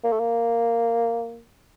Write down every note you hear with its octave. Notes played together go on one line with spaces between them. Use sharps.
A#3
A3
A#3